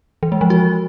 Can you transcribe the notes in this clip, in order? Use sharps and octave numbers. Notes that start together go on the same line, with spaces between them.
E3
G#3
F3
F#4